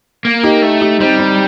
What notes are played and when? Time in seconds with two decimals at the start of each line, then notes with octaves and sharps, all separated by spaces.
0.25 A#3
0.43 D#4 G4
0.62 A3
0.81 D#4 G4
1.00 G3 C4 D#4
1.19 C4 D#4